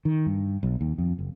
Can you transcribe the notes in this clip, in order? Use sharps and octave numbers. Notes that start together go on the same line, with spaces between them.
D#3
G2
B1
D#2
F2
F#1